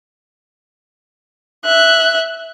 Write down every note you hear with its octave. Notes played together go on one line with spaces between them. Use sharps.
E5 F#6